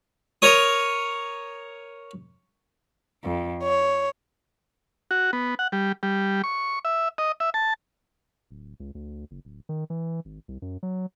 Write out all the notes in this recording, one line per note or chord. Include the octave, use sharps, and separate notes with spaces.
A#4 C#5 D#6
F2
C#5
F#4
B3
F#5
G3
G3
C#6
E5
D#5
E5
A5
D1
C#2
D2
F#1
D1
D#3
E3
G#1
C2
F#2
F#3